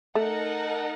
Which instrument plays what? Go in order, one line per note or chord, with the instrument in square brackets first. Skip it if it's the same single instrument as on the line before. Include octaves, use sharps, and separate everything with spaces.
[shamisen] A3 [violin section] D#4 A#4 D#5 F#5 A5